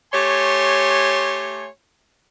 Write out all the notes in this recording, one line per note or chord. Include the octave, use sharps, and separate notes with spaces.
A3 G4 C#5 G#5 C6